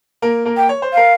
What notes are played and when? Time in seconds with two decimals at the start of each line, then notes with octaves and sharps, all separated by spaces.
0.22 A#3 A#4
0.45 A#3 A#4
0.57 G5
0.69 C#5
0.82 C5
0.93 A#4 F5